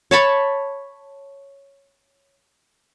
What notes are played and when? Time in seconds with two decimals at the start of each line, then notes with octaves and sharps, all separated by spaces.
0.11 C#5 A5 B5 C#6